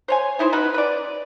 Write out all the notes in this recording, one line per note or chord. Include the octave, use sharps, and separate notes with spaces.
C5 C#5 G#5
E3 D#4 E4 C5
C#4 D#4 F#4 B4
B4 D5